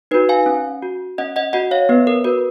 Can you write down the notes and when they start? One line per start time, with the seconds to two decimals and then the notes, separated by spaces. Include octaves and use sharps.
0.11 D#4 B4
0.14 F#4
0.29 F5 G#5
0.46 C#4
0.83 F#4
1.18 C#4 D#5 F#5
1.36 D#5 F#5
1.53 F#4 D#5 F#5
1.71 C#5 F5
1.89 B3 B4
2.07 A#4
2.24 F#4 B4